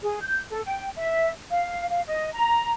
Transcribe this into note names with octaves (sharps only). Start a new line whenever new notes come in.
G#4
G6
A4
G5
E5
F5
F5
D#5
A#5